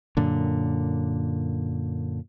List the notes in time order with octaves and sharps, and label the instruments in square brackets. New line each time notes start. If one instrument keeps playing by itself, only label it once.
[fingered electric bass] F#2 A#2 D3